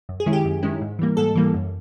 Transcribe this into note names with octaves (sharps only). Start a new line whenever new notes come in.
F#2
G#4
D#3 G#3 C#4 E4
G4
F#2
D#3 G#3 C#4 E4
G#2
E3 G3 A#3
G#2 A4
E3 G3 A#3
F#2